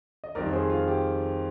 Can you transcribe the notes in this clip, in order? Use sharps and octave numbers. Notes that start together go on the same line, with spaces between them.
D#5
F2 D#3 G3 A#4 D5
G#4 C5
F4
G4